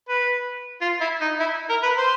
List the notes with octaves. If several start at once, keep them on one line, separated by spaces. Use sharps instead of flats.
B4
F4
E4
D#4
E4
A#4
B4
C5